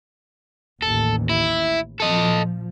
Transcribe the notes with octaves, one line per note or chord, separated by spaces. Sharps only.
A1 D#2 A4
E4
A#2 F3 A4 D#5